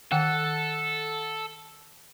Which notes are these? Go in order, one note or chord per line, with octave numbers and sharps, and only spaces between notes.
D#3 A4 F#5 G5